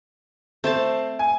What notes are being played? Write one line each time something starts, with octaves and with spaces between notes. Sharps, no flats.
A3 C4 C5 A5
G#5